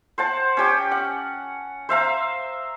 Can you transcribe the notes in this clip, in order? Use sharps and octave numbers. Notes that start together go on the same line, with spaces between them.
C5 F#5 A5
C#4 G4 G5
F#5
C5 E5 F5 A#5